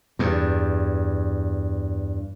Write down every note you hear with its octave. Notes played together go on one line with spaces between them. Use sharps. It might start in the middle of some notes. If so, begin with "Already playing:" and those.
E2 G2